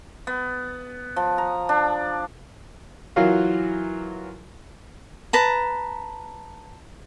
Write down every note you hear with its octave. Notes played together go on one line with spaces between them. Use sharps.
B3
F3
A#5
D4
E3 F#3 F4 F#4 A#4 F5
B4 A5 A#5